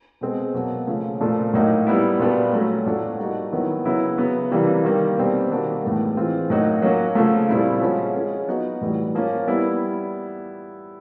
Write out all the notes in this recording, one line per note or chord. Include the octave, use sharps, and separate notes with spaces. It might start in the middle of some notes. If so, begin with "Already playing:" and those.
B2 G#3 C4
B2 F#3 A#3
C#3 F3 A3 C#4
A#2 F3 A3 D4
A2 F#3 A#3 D#4
G3 B3 E4
A#2 G3 B3 D4 F#4
F#3 A3 C#4 F#4
A2 F3 A3 D4 F#4
G3 A#3 D#4 F#4
D#3 F#3 B3 E4
C#3 F#3 B3 E4
C#3 F#3 B3
C3 E3 G3 A#3
D#3 G3 A#3
B2 G3 C4
D#3 G3 A#3 D4 F#4
A2 E3 G#3 B3
E3 G#3 C4 F4
A2 F#3 A#3 D#4 F#4
F#3 A#3 C#4 F#4
C#3 F3 A3
A#2 G3 C4 E4
F3 G#3 C#4 F#4
F3 G#3 C#4 F4
F#3 B3 D#4 F#4
A2 E3 G3
F3 A#3 C#4 F4
G3 B3 E4